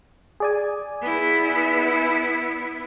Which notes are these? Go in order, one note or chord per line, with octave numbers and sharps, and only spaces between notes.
G#4 D5 G#5
B3 E4